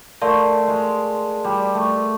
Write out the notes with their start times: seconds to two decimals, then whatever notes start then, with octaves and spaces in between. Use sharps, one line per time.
0.22 A3 A#4 D5 F5 A5 C6
0.68 G#3
1.44 G3
1.75 A3